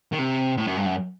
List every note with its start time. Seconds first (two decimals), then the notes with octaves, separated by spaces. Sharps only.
0.12 D#3
0.19 C3
0.57 A2
0.67 F#2
0.77 G2
0.86 F#2